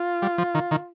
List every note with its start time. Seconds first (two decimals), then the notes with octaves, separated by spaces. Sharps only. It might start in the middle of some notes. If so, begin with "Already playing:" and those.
Already playing: F4
0.22 G3
0.38 F3
0.55 D#3
0.71 D#3